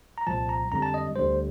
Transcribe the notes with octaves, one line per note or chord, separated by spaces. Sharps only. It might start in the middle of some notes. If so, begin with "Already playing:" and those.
A#5
C2 A#2 F3 A5
A#5
F2 D3 G3 A#5
A5
D#5
D2 D3 G3 C5